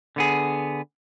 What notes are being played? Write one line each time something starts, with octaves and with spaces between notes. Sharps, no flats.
D3 B3 G#4